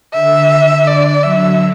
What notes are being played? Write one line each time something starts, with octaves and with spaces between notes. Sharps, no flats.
D3 E5
D3 D5
F#3 E5